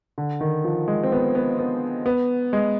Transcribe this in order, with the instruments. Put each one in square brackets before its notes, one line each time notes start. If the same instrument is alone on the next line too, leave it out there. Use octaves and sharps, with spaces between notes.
[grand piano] D3
D#3
F3
G#3
C4
B3
B3
B3
B3
G#3